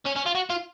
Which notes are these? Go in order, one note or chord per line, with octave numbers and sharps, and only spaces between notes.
C#4
C#4
F4
F#4
F4